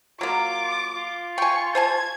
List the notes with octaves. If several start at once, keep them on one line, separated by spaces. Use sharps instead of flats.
F#3 A#3 F4 D6
F4
G5 G#5 C#6
C5 G#5 A5 G#6